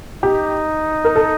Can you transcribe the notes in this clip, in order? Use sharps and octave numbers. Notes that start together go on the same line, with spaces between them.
D#4 G4
A#4
A4